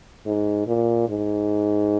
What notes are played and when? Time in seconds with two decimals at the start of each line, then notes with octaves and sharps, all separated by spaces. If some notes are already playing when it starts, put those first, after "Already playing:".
0.26 G#2
0.67 A#2
1.09 G#2